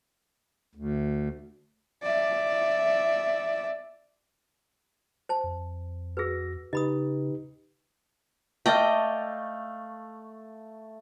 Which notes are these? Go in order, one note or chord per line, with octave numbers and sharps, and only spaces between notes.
D2
D5 E5
C5 A5
F2
F#4 G#4 B4 E6 A#6
C#3 D#4 G4 B4 D#5 B5 D#6
A3 D5 D#5 F5 G5